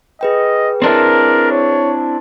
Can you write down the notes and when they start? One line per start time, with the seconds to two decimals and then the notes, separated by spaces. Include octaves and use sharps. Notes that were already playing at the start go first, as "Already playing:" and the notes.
0.21 G#4 B4 D#5 G5
0.82 C4 D4 E4 A#4
1.51 C#5